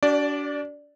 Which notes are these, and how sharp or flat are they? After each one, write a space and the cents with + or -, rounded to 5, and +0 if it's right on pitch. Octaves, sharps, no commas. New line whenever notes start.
D4 -30 F#4 +40 D5 +0